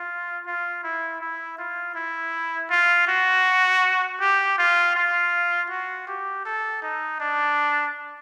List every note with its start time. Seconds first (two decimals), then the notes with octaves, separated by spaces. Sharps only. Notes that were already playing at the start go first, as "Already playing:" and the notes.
Already playing: F4
0.47 F4
0.84 E4
1.21 E4
1.58 F4
1.95 E4
2.71 F4
3.08 F#4
4.20 G4
4.58 F4
4.95 F4
5.70 F#4
6.08 G4
6.45 A4
6.83 D#4
7.20 D4